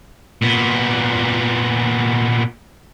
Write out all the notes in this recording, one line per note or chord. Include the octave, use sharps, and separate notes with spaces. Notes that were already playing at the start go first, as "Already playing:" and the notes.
A#2 B3